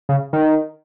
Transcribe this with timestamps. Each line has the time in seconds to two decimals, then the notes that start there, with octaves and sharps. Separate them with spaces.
0.09 C#3
0.33 D#3